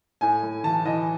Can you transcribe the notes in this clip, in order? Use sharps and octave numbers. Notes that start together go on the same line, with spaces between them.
A2 G#5
A2
E3 A5
E3 D#5